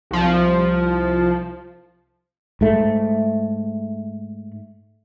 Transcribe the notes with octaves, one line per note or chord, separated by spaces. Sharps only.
C2 F3
G#2 A3